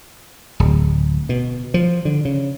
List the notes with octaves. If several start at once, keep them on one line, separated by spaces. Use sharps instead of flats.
D1
B2
F3
D3
C#3